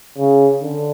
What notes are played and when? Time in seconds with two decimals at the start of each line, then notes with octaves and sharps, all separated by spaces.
0.18 C#3
0.62 D3